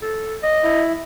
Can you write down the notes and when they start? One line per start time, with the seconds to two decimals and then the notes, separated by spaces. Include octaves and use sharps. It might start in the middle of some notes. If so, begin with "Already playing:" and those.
0.02 A4
0.43 D#5
0.64 E4